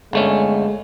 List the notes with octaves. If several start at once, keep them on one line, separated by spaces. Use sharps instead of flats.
G1 G#3 A3 C#4